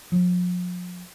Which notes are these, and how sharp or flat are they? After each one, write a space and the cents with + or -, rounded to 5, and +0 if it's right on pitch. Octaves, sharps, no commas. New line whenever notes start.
F3 +45